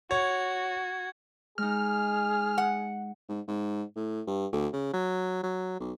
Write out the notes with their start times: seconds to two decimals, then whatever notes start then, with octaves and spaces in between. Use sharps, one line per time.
0.11 F#4 C#5 G#6
1.58 G#3 D#4 G#4 F6
2.58 F#5
3.29 G#2
3.48 G#2
3.96 A2
4.27 G2
4.53 D2
4.73 C#3
4.93 F#3
5.43 F#3
5.80 B1